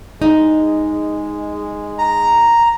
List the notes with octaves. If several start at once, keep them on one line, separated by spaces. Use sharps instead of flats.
G#3 D#4
A#5